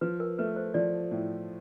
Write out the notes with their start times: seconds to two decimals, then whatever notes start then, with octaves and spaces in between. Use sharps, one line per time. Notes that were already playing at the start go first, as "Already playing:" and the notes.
0.01 F3 B4
0.20 A#4
0.38 A3 B4
0.56 C5
0.74 F3 D5
1.11 A2